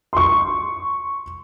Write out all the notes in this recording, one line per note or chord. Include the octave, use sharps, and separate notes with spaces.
C6 C#6